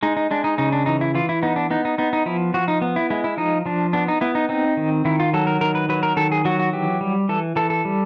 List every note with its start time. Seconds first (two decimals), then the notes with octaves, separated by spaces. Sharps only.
0.03 G#3 D#4
0.17 D#4
0.31 G#3 D4
0.44 D#4
0.58 C#3 D#4
0.72 D4
0.86 E3 D#4
1.01 E4
1.15 E3 F4
1.29 E4
1.43 B3 D#4
1.56 D4
1.71 B3 D#4
1.85 D#4
1.98 B3 D#4
2.13 D#4
2.26 F3 E4
2.54 F3 F#4
2.68 D#4
2.82 B3
2.96 E4
3.10 G#3 E4
3.24 E4
3.37 F3 D#4
3.66 F3 D4
3.93 B3 D4
4.08 D#4
4.21 B3 E4
4.35 D#4
4.49 C4 D#4
4.77 D#3
5.05 D#3 E4
5.20 F4
5.34 F#3 A4
5.47 A#4
5.61 D#3 A#4
5.75 B4
5.89 F#3 B4
6.03 A#4
6.17 D#3 A4
6.32 G#4
6.45 F#3 F#4
6.59 F#4
6.73 E3 G4
7.01 G3
7.29 E3 A4
7.56 E3 A4
7.70 A4
7.85 G3